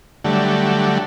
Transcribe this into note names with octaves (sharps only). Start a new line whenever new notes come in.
D3 F#3 G3 A3